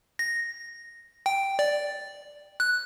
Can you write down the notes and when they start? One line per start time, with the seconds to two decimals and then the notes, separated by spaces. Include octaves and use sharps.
0.19 A#6
1.26 G5
1.59 D5
2.60 F#6